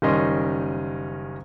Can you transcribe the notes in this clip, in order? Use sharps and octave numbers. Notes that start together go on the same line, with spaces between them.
F#1 D#3 G3 C#4 D#5 C6